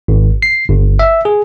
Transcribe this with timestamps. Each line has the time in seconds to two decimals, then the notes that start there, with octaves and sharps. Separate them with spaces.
0.08 G#1
0.42 C7
0.69 G1
0.99 E5
1.25 G#4